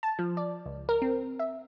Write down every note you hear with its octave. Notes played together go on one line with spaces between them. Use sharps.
A5
F3
D5
C#2
A#4
C4
E5